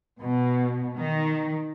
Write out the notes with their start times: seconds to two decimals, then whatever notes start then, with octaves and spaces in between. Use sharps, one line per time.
0.20 B2
0.98 D#3